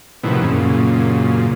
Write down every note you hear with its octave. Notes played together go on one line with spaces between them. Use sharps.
A2 C3 D#3 F3 B3 E4
F#2 A#2 C#3